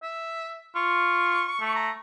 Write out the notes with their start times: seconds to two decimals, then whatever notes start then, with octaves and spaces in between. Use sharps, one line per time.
0.03 E5
0.75 F4 C#6
1.60 A3
1.75 A#5